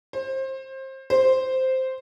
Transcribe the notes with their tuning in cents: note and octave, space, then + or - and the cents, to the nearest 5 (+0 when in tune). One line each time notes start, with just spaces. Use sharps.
C5 +25
C5 -5